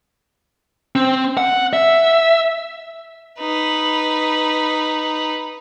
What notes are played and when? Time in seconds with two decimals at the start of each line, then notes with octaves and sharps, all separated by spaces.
0.96 C4
1.37 F#5
1.73 E5
3.40 D#4 B4